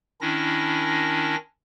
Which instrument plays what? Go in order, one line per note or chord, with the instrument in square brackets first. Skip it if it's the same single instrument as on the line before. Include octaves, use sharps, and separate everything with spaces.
[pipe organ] D#3 C#4 D4 E4 A#6